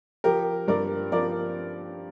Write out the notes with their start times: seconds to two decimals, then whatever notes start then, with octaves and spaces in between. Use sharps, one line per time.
0.24 F3 G4 A#4
0.68 G2 A#4 D5
1.12 F3 A#4 D5